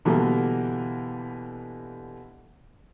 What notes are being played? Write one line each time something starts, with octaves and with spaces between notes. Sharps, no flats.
B2 D3 E3 G3 A#3